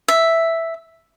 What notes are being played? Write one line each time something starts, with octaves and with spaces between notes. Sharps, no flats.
E5